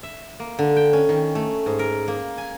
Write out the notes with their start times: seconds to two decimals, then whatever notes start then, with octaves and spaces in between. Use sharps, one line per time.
0.03 E5
0.40 A#3
0.59 D3
0.76 G5
0.93 C#4
1.09 D#3
1.35 A3
1.66 G#2
1.79 A#4
2.08 A#3
2.38 G#5